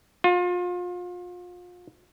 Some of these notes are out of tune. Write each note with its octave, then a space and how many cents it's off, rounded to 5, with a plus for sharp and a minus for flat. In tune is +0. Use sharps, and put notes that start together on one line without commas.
F4 +30